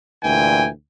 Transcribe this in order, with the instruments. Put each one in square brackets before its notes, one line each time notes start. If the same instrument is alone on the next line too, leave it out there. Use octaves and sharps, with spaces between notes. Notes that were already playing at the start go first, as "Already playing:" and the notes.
[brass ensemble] D2 A#2 E3 G5 G#5